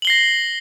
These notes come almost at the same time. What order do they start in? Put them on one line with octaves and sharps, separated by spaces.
F#7 G7 C7 A#6